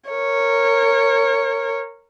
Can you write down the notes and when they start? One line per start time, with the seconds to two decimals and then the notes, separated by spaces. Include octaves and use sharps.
0.10 A#4 C#5